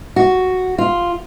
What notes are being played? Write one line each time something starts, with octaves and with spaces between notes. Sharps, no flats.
F#4
F4